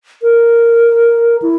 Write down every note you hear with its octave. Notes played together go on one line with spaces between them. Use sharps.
A#4
E4